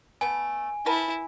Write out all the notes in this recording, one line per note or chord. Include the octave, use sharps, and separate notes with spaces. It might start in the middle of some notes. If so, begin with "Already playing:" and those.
A3 B3 G#5
E4 A#4 B4 A5